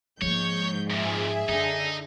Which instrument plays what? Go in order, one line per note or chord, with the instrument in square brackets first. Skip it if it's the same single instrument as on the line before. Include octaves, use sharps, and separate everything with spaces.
[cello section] G#2 [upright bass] F3 A#3 [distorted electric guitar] C#5 [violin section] G6
[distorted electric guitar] F2 A#2 [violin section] G#4 E5
[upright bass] F#2 [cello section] D3 [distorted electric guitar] D#4